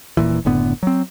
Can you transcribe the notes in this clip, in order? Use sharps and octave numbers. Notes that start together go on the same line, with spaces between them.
D#1 C#2 A#2 E3
F#1 A2 D3 B3
F#3 C4